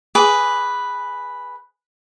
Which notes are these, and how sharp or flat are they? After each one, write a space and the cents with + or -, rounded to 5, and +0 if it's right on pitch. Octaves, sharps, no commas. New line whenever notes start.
G#4 +0 B4 +0 D6 -15